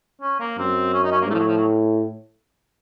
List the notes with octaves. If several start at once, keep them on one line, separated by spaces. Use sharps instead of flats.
C#4
A#3
F#2 C4
C#4
D#4
C#4
A#3
A2 F3 A3
F#3
F3
F#3